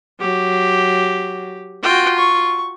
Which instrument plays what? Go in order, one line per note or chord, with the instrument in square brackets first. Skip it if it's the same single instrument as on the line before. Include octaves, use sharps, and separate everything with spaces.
[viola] F#3 [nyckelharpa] G4
[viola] F4 [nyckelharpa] F#4 G5
[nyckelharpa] C#6